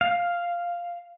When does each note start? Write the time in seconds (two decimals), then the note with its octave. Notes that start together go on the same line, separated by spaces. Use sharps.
0.01 F5